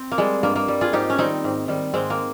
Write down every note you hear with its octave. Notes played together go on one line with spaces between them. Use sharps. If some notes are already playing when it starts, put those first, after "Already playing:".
Already playing: C4
A#3
G3 G#3
G2 A#3
A#3
G3
F4 G#4
G#2 D#4 G4
C#4
D#3 G3 C4 D#4
G#2
D#3 G3
G#2 G#3 C4
A#3